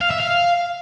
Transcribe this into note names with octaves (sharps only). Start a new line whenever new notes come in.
F5
E5
F5